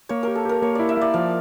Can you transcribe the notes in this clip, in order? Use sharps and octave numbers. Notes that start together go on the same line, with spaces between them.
A#3 C#5
G4 A#4
A4
G4 A#4
A#3 C#5
E4 D5
E5
A#3 D5
F3 F5